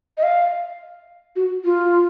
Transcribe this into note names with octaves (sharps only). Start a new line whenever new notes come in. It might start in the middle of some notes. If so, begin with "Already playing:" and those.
D#5
F5
F#4
F4